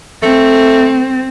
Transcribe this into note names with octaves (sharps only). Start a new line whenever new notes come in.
A3 C4